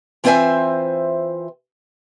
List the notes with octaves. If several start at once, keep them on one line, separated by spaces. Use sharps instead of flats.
E3 C4 F4 C5 E5 G#5